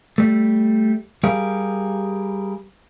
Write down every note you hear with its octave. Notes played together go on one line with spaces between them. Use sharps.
G3 A3
G3 G4 G#4 A#4 F5